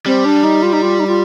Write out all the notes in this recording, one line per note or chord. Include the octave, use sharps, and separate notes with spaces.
G3 C4
D4
D#4
F4
D#4
F4
D#4
F4